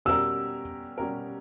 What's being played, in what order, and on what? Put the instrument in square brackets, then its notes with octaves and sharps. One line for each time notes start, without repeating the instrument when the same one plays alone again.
[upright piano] B2 G3 C#4 G4 A#4 [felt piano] E6
[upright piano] B2 G3 C#4 G4 A#4